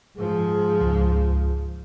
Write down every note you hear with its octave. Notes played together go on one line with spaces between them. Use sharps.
G#2 F3 G#4
C#2